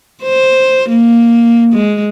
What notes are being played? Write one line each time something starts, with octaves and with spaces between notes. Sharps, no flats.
C5
A#3
G#3